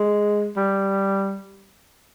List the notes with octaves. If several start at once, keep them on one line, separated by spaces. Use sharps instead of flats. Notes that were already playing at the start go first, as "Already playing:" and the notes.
Already playing: G#3
G3